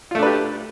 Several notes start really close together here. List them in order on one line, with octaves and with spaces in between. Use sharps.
F4 A3 D4 B4 G4